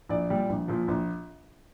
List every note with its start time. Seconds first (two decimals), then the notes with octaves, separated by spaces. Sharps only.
0.09 A#1 D5
0.30 A#2 G3
0.50 A#1
0.68 A#2 F3
0.88 A#1